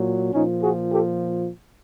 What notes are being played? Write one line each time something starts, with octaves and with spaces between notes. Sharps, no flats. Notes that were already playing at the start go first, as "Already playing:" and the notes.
Already playing: A#2 F#3
A#2 F3 C#4 D#4
F#4 G#4
G4 A4